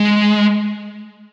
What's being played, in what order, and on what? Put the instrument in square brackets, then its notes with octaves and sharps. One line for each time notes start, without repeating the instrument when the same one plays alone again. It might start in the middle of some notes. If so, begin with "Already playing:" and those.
Already playing: [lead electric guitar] G#3